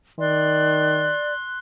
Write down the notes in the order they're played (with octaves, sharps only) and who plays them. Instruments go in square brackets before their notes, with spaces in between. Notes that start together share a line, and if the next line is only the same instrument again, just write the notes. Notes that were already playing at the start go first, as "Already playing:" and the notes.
[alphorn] D#3 [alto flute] D5 [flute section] C6 F#6